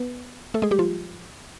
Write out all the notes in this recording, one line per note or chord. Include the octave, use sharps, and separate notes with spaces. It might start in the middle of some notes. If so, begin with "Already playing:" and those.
Already playing: B3 B4
A3 A4
G#3 G#4
G3 G4
F3 F4